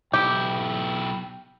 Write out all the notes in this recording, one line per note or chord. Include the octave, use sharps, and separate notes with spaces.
B1 E4 G4 G5